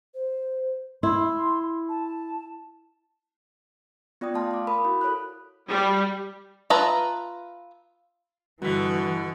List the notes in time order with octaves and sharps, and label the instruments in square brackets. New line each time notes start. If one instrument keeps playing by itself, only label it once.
[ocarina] C5
[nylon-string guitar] E4 [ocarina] C6
[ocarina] A5
[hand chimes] B3 F4 D5 G5 D#6
A3 F5 A5 C6 F6
F5 D6
A#4 B5 D#6
E4 F#4
A4 C#5 B5 F#6
[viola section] G3
[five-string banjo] F4 B4 E5 A5 A#5
[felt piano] G2 B6 [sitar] B2 D3 [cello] E3 [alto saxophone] F#4